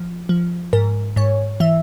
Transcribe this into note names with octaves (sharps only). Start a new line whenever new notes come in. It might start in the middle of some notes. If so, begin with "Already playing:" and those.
Already playing: F3
F3
G#2 A#4
G#2 C#5
E3 E5